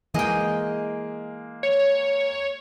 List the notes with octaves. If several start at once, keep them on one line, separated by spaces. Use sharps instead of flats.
E3 G#3 A#3 G#4 D#5 G5
C#5